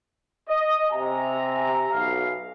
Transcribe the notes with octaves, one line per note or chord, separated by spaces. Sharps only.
D#5
C3 E5 G#5 A#5
B1 F5